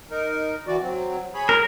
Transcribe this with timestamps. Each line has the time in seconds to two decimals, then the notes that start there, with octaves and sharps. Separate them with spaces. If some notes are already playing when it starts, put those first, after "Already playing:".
0.11 D#4 A#4
0.67 E3 F#4 D5
0.82 F#3 C4
1.35 G#4 C#5 B5
1.49 A#4